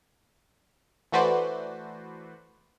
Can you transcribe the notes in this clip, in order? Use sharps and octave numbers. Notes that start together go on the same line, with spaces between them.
E3 A3 F#4 B4 C5 D5